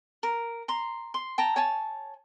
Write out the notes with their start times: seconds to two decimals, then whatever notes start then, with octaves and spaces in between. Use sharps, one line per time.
0.23 A#4
0.68 A#5 C6
1.14 C6
1.38 G5 A5 A#5
1.56 C#5 G#5 A5